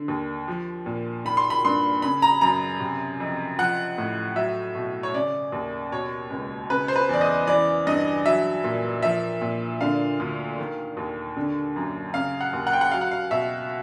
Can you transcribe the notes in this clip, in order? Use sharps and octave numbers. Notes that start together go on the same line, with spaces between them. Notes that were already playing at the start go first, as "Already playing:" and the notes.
Already playing: D3
D#2
F3
A#2
D#3 B5
C6
B5
G2 C6
C#3 B5
A#5
F#2 A#5
C3
F2
F3 F#5
A2
F#3 E5
B2
C#5
C#3 D5
D#2
B2 C#5
C#2
C#3 B4
C5
B4
E2 D5
D#5
E3 D5
G2 D#5
F#3 E5
A#2
F3 E5
A#2
D3 F5
D2
D#3
D#2
D3
F#2
C#3 F5
F#5
D#2
F#5
G5
F#5
F#3 F5
F#5
F5
B2 E5